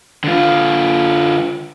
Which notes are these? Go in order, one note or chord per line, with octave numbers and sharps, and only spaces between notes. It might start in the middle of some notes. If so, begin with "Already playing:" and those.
D3 F4